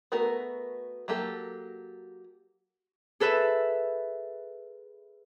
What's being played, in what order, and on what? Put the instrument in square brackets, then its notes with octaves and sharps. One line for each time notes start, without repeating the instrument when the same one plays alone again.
[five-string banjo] A3 B3 F#4 A#4
F#3 A#3 G4 A4
[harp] G#4 A4 B4 E5